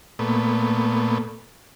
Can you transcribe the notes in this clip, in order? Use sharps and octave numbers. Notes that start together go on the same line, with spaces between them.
A#2 A3 B3